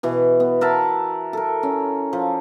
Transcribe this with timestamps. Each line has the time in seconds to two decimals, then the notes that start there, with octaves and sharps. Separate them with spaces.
0.03 B2 E3
0.40 B3
0.61 A#4 E5 F#5 A5
1.33 A4 A#4
1.63 C#4
2.13 F3